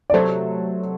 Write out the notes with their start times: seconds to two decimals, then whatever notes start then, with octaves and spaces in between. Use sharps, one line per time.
0.10 D5
0.14 C3 F#3 A3 A4 C5